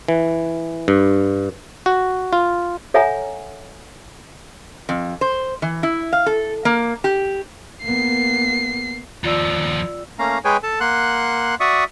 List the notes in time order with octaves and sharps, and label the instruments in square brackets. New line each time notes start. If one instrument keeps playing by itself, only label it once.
[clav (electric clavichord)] E3
G2
F#4
F4
[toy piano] A4 C#5 E5 F#5 G#5 A#5
[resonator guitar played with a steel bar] F2
C5
E3
E4
F5
A4
A#3
G4
[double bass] A#3 B3 [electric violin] C7
[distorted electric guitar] D#2 F3 [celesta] F4 D5 E6
[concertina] A3 A#3 C#4 F5 A#5
G#3 G#4 B4 C#5 G5 G#5
A4 A5
A#3 F#5 C6 F#6
F#4 D5 E5 C#6 D#6